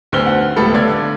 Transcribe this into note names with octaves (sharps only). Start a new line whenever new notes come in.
D2 D3 B3 C4 F6 G7
F#5
C#2 A2 G3 B3 A4 B5
D3 D5 F5 G#6